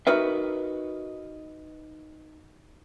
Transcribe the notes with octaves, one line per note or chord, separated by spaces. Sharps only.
D#4 F#4 A#4 B4 E5